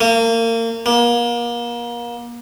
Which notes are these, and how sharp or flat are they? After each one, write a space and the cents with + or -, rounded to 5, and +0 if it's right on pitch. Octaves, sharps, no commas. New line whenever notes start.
A#3 -30
A#3 +35